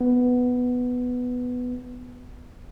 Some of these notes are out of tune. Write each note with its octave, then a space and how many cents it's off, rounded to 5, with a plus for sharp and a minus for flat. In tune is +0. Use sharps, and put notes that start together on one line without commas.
B3 +5